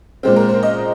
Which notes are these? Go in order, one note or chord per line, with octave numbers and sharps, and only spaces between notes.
A#2 G#3 C4 C5
A#4
C5
D#5